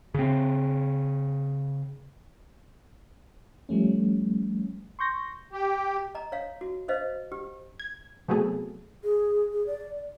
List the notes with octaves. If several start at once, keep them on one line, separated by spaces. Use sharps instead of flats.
C#3 C4
F3 G3 A3 C#4
C6 C#6 G6 A#6
G4
D#5 A#5
C#5 F5
F#4
B4 C5 D#5 F5
G4
G#6
C3 F#3 A3 B3 G#4 A4
G#4
G#4
D5